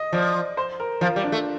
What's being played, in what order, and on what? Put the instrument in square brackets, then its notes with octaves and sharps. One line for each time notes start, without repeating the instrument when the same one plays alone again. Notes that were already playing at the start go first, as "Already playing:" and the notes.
Already playing: [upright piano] D#5
[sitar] F3 [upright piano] D5
[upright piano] C5
A#4
[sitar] F3 [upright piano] F4
[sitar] G3
[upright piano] D4
[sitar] A3